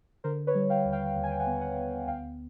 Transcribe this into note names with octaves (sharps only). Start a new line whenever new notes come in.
D3 A#4 C5
B4 C#5
G3
F5 G5
D#2
F5 G5
D#2
G#5
G5
F#5 G#5
B3
F#5 G#5
B3
D2 F5 G5